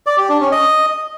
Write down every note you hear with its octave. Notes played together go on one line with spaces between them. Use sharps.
D5
G4
D4
C#4
D#5